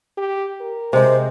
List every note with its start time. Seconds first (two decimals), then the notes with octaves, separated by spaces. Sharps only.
0.18 G4
0.61 A#4
0.93 C3 G#3 C5